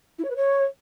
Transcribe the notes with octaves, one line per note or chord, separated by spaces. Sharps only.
E4
C#5
B4
C#5